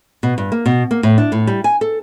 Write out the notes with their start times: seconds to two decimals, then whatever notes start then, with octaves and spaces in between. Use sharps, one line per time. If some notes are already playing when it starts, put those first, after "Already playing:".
0.23 B2
0.38 G2
0.52 A#3
0.66 B2
0.91 A#3
1.03 A2
1.18 D4
1.32 A2
1.47 G3
1.64 G#5
1.81 A4